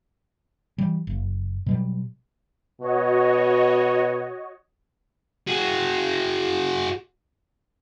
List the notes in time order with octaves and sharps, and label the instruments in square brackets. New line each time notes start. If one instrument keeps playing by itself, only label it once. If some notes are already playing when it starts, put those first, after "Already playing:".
[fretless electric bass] E3 G3
F#1
B2 F#3 G3
[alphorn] B2 [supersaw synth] F#4 C#5 D#5
[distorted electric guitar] F#4 G#4